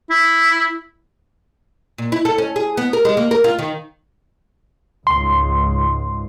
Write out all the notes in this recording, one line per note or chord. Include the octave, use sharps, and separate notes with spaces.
E4
A#2
E4
A4
C#4
G#4
B3
A#4
G#3
A#3
A#4
F4
D#3
C#2 G#2 C6